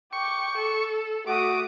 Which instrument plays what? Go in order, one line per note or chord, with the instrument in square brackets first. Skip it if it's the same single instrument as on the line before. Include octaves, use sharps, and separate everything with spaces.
[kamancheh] G5 D6 [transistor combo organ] C#6
[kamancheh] A4
[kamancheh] A3 D#6 [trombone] F#4 [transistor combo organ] D6